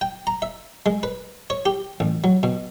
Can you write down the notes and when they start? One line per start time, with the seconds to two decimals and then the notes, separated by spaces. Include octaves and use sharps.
0.01 G5
0.27 A#5
0.42 E5
0.86 G#3
1.03 B4
1.50 C#5
1.66 G4
2.00 A1
2.24 F#3
2.43 B2